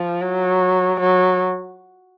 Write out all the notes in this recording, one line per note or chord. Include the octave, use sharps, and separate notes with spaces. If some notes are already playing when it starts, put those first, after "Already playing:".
Already playing: F3
F#3
F#3